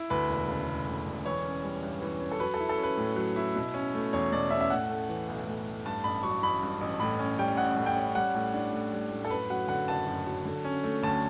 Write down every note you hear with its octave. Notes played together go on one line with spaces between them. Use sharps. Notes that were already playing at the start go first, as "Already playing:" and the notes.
Already playing: E4
D2 B4
E1
C#3
E1
D2
E1
E3 C#5
C#4
G3
G2
E3
C#4
A4
F#3 B4
A4
E4
A4
C#4
B4
A2
F#3
E4
B2
C#4
A3
E2 C#5
B2 D5
C#4 E5
E5
A2 F#5
A3
E3
B1
A2
A3
G2 A5
A1 B5
F#3 C#6
A1 B5
G2
A1
A2 B5
C#4
G3 G5
A1 F#5
A2
G5
C#4
G3 F#5
A2
D4
A2
G3
A2
A4
F#2 B4
F#3 F#5
D3 F#5
F#1 A5
F#2
F#3
D3
C#4
A3
D2 A5